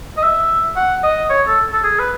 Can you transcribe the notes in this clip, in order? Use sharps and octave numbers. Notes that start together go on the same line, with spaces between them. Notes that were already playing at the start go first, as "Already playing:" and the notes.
D#5
E5
F#5
D#5
C#5
A4
A4
G#4
B4